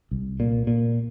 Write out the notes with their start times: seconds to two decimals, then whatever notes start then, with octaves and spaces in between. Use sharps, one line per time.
0.11 C2
0.40 A#2
0.67 A#2